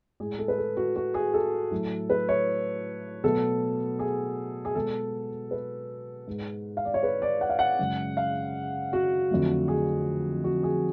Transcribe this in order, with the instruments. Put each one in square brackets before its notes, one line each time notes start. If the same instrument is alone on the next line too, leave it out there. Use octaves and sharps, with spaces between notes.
[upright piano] A2 G#3 G#4
A4
B4
A4
F#4
F#4
G#4
A4
A2 F#3 A3
B4
C#5
B2 F#3 A3 A4
G#4
G#4
B2 G#3 A4
B4
G#2 G#3
F5
D5
C#5
B4
D5
F#5
F5
F#5
F#2 C#3 G#3
F5
F#4
F2 D3 F#3 A3
G#4
F#4
G#4